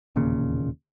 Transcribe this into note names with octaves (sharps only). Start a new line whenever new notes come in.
E1 D#2 A#2 C#3